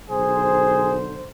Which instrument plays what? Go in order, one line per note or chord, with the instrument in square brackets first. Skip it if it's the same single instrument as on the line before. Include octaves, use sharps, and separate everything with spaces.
[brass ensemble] B1 D3 C5 [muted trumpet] G#4